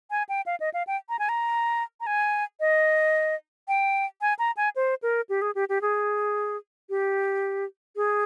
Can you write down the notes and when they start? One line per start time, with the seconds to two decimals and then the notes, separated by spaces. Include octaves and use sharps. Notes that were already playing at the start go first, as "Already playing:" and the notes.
0.11 G#5
0.29 G5
0.46 F5
0.60 D#5
0.74 F5
0.87 G5
1.09 A#5
1.19 G#5
1.29 A#5
2.01 A#5
2.07 G#5
2.60 D#5
3.68 G5
4.21 G#5
4.39 A#5
4.57 G#5
4.76 C5
5.03 A#4
5.29 G4
5.42 G#4
5.55 G4
5.69 G4
5.82 G#4
6.90 G4
7.96 G#4